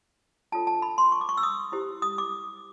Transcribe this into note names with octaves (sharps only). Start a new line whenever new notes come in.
D4 F4 A4 C#5 A5
A5
B5
C6
C#6
D6
C#6
E6
D#6
E4 G4 C5
D#6
D6